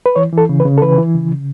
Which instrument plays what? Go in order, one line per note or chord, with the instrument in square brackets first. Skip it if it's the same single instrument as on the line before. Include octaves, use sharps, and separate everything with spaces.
[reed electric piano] B4
E3 C#5
E3
A4
C#3
B4
C#3
A4
E3 B4
E3
C#3
C#3